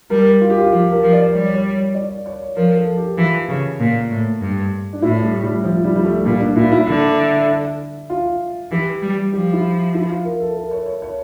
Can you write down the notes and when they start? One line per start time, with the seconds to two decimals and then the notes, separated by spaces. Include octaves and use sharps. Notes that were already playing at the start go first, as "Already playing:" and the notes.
0.10 G3 A#4
0.41 F4
0.50 G4
0.58 F4
0.72 F3 G4
0.92 A#4
1.03 F3
1.13 D5
1.33 G3 C#5
1.54 C#5
1.95 D5
2.26 C#5
2.56 F3 A#4
2.77 A4
2.97 G4
3.18 E3 F4
3.49 C#3
3.80 A#2
4.10 A2
4.41 G2
4.93 D4
5.02 A2 E4
5.23 G3
5.43 G3
5.64 F3
5.84 G3
5.96 G3
6.05 A3
6.25 A#2 G3
6.41 D4
6.56 A#2 E4
6.72 E4
6.87 D3
8.10 F4
8.71 E3 G4
9.02 G3
9.32 F3 G4
9.53 E4
9.94 E4
10.10 F4
10.25 A#4
10.40 A4
10.56 A#4
10.71 C#5
10.86 C#5
11.02 C#5